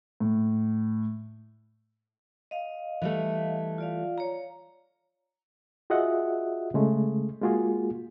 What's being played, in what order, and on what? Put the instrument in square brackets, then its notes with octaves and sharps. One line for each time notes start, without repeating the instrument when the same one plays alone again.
[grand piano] A2
[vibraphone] D#5 F5
[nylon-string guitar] E3 G3 A3
[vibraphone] F4 D5 F5
C#5 A#5
[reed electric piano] F4 F#4 G#4 D#5 E5 F#5
C#3 G#3 A3
G#3 A#3 F4 F#4 G#4